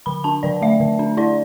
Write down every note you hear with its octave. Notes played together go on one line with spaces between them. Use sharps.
D3 B5
D4 A5
D3 D5
A3 E5
D3
D4
E4 D5